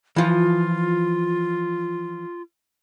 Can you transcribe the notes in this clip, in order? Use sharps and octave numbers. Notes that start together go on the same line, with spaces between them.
E3 F3 F4